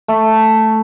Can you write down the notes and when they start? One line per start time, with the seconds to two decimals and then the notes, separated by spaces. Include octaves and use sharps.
0.08 A3